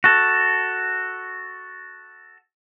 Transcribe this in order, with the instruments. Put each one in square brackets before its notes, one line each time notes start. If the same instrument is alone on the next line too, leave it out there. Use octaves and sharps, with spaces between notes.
[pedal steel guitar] F#4 A4